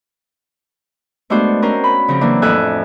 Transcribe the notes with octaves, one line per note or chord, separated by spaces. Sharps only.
G#3 A3 B3 D4 F#4 C5
C4 C#4 A#4 C5
B5
C#3 F3 C4
E3 F#3 A#3 D4
F2 A2 A4 E5 G#5 F#6